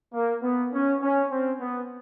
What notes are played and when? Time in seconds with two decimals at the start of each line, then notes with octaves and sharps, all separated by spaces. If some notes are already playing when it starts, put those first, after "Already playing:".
0.13 A#3
0.42 B3
0.72 C#4
1.02 C#4
1.30 C4
1.60 B3